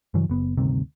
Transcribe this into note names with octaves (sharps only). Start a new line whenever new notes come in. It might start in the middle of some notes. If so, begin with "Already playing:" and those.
G2 C#3 E3 F#3
F#1 B3
D2 G2 C3 D#3